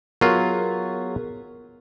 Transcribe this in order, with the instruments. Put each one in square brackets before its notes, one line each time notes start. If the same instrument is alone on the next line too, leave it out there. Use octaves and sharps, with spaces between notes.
[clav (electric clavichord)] F#3 F4 [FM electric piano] B3 G#4 A#4